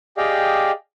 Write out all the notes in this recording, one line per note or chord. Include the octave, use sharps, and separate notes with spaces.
G4 G#4 D5 D#5 F5 G5